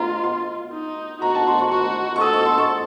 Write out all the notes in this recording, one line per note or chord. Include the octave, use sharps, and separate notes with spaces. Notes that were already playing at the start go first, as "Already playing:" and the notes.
Already playing: F4 A#5 C6
C6
D#4
F#4 A#5
A5
C6
C#6
F#4 C#6
C#6
A4 D#6
C#6
C6
C#6